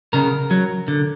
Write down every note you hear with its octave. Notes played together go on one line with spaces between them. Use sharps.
C#3 A#4
F#3
D3